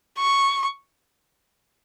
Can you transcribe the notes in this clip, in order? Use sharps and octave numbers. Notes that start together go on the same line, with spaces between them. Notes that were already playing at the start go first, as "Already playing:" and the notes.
C#6